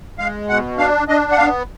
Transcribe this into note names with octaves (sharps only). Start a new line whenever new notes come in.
G#3 F5
B2 F#5
D4 F5
D4 D#5
F#5
B3 F5